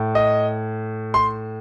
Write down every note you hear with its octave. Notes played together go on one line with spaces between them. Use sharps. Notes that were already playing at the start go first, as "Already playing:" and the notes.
Already playing: A2
D#5
C6